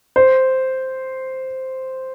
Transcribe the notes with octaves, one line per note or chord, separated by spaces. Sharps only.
C5